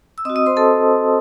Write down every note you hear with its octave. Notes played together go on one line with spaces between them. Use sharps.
E6
C4 F#4 D#5 D#6
D#5 D#6
C5 C6
A4 A5